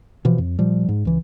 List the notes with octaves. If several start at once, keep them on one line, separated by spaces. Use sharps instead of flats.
B2 E3 F3
F2
A#2 F3 G3
G#2
C#2 E3